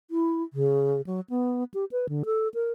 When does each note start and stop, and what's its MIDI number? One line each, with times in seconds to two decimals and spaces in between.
0.11 0.43 64
0.53 1.01 49
1.07 1.20 54
1.30 1.64 59
1.74 1.85 67
1.92 2.06 71
2.09 2.23 50
2.25 2.48 69
2.54 2.72 70